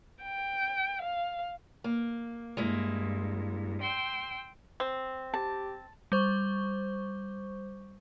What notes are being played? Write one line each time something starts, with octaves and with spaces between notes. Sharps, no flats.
G5
F5
A#3
G2 G#3 A#3 E4
G5 C6 E6
C4
G4 A5
G3 C5 C#6